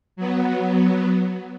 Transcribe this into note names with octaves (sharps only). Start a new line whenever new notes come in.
F#3 B3